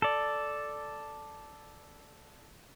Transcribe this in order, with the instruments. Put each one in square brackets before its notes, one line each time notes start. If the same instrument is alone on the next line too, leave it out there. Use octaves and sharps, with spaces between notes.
[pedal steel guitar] A4 D5